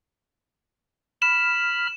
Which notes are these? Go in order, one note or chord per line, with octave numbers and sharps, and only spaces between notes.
B5 F6 E7